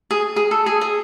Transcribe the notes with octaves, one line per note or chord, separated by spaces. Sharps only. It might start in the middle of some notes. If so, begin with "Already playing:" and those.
G#4
G#4
A4
G#4
G#4